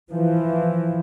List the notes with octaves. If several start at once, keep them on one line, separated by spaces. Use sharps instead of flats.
E3 F3